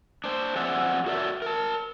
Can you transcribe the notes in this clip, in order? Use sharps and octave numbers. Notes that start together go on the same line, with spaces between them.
D4 C5
F3 C4 G#4 D5 E5 F#5
F#4 A4 A#4 D5 E5
A#4 A5